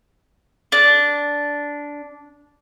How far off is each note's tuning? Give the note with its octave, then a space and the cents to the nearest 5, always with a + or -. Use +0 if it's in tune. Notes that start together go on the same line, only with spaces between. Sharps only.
D4 -10